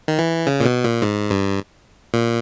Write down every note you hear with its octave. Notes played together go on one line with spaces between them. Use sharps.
D#3
E3
C#3
A#2
B2
A#2
G#2
G2
A#2